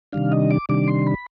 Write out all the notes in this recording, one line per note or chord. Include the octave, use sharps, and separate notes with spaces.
C3 D#3 G3 D4 F5
D#5
D6
C3 D#3 G3 D4 D6
C6
B5